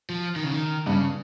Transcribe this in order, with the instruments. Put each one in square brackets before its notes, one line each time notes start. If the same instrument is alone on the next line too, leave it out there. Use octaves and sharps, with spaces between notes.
[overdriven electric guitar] F3
D#3
C#3
D#3
[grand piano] G2 [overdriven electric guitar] C#3